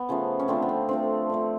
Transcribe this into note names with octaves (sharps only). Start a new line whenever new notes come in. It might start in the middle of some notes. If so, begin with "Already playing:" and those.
Already playing: B3
C#3 F3 A3
C#4
D3 F3 A3 C4
B3
C4
D3 F3 A3 C4
D3 F3 A3